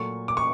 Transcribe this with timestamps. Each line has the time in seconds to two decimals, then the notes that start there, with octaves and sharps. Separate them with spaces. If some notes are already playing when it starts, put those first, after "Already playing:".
Already playing: A#2 F#3 A3 C#6
0.28 D6
0.37 C#6